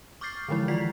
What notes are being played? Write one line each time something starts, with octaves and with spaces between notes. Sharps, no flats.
C#6 D6 F6 G6 A6 C7
D3 E3 F3 G#3 E4
D#3 F4 D5 B6 C7